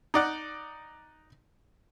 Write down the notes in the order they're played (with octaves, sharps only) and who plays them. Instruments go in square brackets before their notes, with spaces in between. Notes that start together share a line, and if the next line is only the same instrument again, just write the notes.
[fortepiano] D#4 D5 F#5